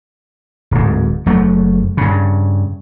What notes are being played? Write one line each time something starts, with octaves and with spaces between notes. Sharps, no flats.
D1 G#2
F#1 F#3 A3
G2 C#3